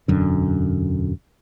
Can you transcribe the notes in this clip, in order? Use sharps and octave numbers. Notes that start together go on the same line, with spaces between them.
E1 F#2 D3